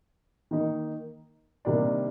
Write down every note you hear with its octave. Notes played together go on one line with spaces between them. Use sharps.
D#3 A#3 D#4
C3 D#3 G3 A#3 D4